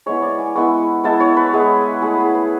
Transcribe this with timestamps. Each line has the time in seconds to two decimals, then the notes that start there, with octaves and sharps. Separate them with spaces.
0.06 G#3 B3 E4 C#5
0.22 D5
0.39 G#5
0.55 G#3 B3 E4 C#6
1.04 G#3 B3 E4 A5
1.20 C#5
1.37 B4
1.53 G#3 B3 E4 G#4
2.02 A3 E4 G#4
2.18 G#4
2.35 B4